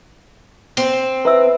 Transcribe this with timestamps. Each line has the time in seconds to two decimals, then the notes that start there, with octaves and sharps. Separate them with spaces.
0.77 C4
1.25 E4 B4 E5 E6